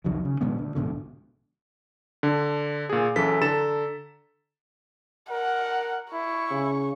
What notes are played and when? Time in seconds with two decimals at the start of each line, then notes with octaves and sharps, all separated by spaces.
0.04 C2 F2 D#3 F#3
0.25 C#3
0.41 A#2 D#3 G#3 B3
0.58 D2
0.75 A#1 G#2 B2 D3
2.23 D3
2.89 A#2 G#4
3.16 F#2 E3 A4 B6
3.41 D3 A4 A#5 A6 E7
5.31 A#4 F#5
6.13 E4 C#6
6.51 C#3